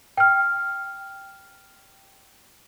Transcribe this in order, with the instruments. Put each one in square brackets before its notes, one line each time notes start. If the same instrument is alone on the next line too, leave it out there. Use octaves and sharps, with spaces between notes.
[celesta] G5 F6